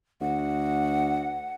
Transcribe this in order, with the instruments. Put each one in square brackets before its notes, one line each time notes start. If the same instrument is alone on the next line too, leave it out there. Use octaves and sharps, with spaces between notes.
[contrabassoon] D2 [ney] F#5